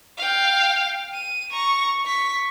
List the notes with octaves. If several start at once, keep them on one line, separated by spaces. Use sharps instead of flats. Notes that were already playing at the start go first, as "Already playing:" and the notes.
F5 G5
D#7
A#5 C#6
C#6 B6